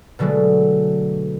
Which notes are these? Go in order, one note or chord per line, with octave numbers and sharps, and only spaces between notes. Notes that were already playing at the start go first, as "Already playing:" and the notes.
B2 D3 F#3 G#3 A3